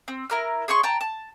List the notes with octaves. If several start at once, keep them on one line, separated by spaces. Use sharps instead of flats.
C4
E4 A#4 F6
G#4 C#5 C6 C#6
G5 A5 A#5
A5